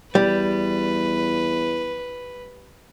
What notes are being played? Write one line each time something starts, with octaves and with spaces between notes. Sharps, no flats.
E2 G3 B4